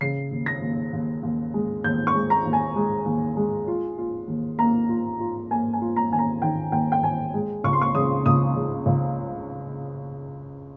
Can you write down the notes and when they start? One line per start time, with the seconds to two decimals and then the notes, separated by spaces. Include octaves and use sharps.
0.01 C#3 C7
0.31 D#2
0.46 A#6
0.62 D#2
0.93 D#2
1.23 D#2
1.54 G#3
1.84 D#2 G6
2.07 C#6
2.15 G#3
2.30 A#5
2.45 D#2
2.53 G#5
2.76 G#3
3.06 D#2
3.37 G#3
3.67 F4
3.98 F4
4.28 D#2
4.59 A#3 A#5
4.89 F4
5.20 F4
5.51 A#3 G#5
5.73 G#5
5.81 F4
5.96 A#5
6.12 D#2 G#5
6.19 A#5
6.42 D#3 G5
6.72 D#2 G5
6.92 G5
7.03 D#2 G#5
7.34 G#3
7.64 C#2 C#6
7.73 C6
7.82 C#6
7.95 C#3 D#6
8.26 C#2 D#6
8.56 C#3
8.86 C#2